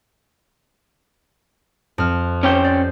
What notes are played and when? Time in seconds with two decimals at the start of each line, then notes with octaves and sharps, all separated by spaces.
1.98 F2 F6
2.43 C#4 G4 C5 C#5 G5
2.64 D5